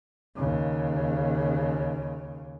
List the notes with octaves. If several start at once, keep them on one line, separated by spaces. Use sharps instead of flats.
D#2 C#3